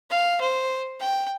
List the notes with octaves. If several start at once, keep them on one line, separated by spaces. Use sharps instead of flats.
F5
C5
G5